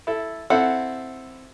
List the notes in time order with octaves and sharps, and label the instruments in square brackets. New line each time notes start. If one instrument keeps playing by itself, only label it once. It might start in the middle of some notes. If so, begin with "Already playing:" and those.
[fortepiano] E4 A4
[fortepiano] C4 E4 A4 [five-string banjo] F#5